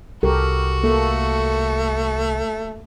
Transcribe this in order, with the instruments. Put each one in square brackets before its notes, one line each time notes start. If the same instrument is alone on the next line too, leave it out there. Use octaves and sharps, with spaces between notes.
[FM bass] C2 [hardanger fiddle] F#4 [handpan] G4 A4 A#4
[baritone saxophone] A3 [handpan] A#3 A4